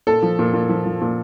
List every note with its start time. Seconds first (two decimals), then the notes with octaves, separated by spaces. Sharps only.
0.07 A#2 A4
0.23 F3
0.39 A#2
0.54 A#2
0.69 F3
0.86 F3
1.02 A#2